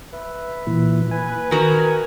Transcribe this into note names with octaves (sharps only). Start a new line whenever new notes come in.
B4 E5
A#2 E3
B4 G#5
D#3 F#4 A#4 A#5